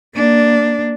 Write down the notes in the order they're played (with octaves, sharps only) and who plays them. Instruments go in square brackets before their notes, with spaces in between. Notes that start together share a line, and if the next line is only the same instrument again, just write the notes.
[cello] A#3 D4